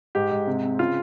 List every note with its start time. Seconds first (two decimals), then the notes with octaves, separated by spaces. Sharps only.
0.15 G#2 G4
0.31 G#2
0.47 C3
0.63 C4
0.79 C#3 F4